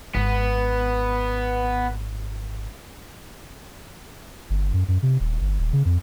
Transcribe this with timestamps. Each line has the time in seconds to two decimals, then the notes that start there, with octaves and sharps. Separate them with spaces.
0.15 G#1 B3
4.50 G1
4.73 F#2
4.88 F#2
5.02 C3
5.20 D#1
5.41 G1
5.59 D#1
5.73 C#3
5.85 F2